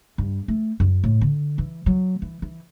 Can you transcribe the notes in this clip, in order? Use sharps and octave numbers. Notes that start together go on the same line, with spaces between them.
G2
A3
F#2
A2
D3
E3
F#3
E3
E3